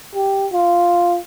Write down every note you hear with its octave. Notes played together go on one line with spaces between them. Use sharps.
G4
F4